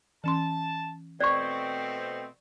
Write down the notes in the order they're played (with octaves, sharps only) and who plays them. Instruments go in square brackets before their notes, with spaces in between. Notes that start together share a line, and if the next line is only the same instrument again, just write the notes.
[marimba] E3 C#4 C6 [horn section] A5
[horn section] B2 A3 C4 [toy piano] D5 C#6 [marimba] F#6